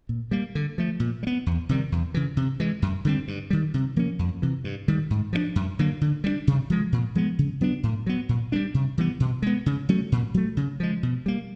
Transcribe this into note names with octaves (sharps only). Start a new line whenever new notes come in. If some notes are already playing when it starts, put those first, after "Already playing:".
A#2
G3 A#3
D3
F3 A3
A#2
G3
B3
E2
C3 D#3 G3
E2
C#3 E3
C3
E3 G#3
F#2
D3 G3 C4
G2
D#3 G3
C3
F3 A#3 C#4
F2
C3 E3
G2
D#3 G3
G#2
F3 A#3 D4
F#2
D3 F#3 A#3
D3
G3 B3 D4
C3
F3 G#3
A#2
F3 G#3 B3
C#3
F#3 B3 D4
A2
F#3 B3
A#2
G3 A#3 D4
C3
E3 G3 B3
B2
G#3 B3
C#3
F#3 A3 C#4
A#2
F#3 A3
C#3
F3 G#3
B2
G3 A#3